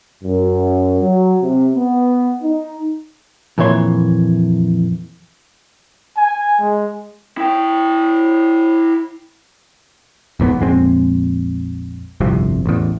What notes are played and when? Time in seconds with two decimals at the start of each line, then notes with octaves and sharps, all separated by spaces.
0.24 F#2
1.00 F#3
1.42 C3
1.74 B3
2.42 D#4
3.58 F2 A#2 E3 C#5 C6
6.17 G#5
6.61 G#3
7.37 E4 G5
10.40 E1 G#2 A#3 B3
10.59 A#1 F2 G#3 C4
12.20 G1 C2 F2 C3
12.66 A1 E2